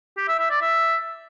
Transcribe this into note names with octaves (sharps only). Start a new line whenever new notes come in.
G4
E5
E5
D5
E5